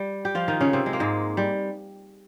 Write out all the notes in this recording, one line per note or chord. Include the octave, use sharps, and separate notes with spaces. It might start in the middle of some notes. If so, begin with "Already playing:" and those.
Already playing: G3
G4
F3 F4
D#3 D#4
C#3 C#4
C3 C4
G#3
A#3
G#2 G#3
G3